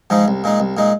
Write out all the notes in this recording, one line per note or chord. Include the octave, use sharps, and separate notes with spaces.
G#2 F3 G#3 D#4
C2
A#2 G#3 D#4
C2
A#2 G#3 D#4